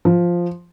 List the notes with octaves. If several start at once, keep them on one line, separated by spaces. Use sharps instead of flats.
F3